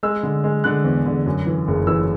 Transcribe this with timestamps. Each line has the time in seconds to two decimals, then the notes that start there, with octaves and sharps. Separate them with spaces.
0.03 G#3 E6
0.23 D3
0.44 G#3
0.64 D3 F#6
0.84 E2
1.06 D3
1.26 F#2
1.46 E3
1.68 F#1
1.87 E3 E6